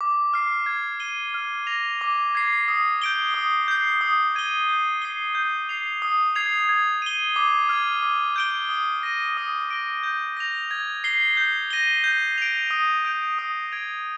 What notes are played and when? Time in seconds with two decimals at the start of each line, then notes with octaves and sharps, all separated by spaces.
0.01 D6
0.34 F6 C7
0.66 G#6
1.00 D#7 G7
1.34 F6
1.67 A#6 F7
2.01 D6
2.35 G#6 C7
2.68 D#6
3.02 G6 D7 G7
3.34 D#6
3.68 G6 C7
4.01 D#6
4.35 G#6 D#7 G7
4.69 G6
5.02 C7 G7
5.35 G6
5.69 C7 F7
6.02 D#6
6.35 G#6 C7 F7
6.69 G#6
7.02 D#7 G7
7.36 D6
7.69 F6 G#6
8.02 D6
8.36 G6 D7 G7
8.69 D#6
9.03 A#6 D#7
9.37 D#6
9.70 A#6 D7 G7
10.03 G6
10.37 A#6 F7
10.71 G#6
11.04 C7 G7
11.37 G6
11.70 A#6 D#7 G7
12.04 G6
12.38 D7 F7
12.71 D#6
13.05 G6 D7 F7
13.38 D#6
13.72 G#6 D7 F7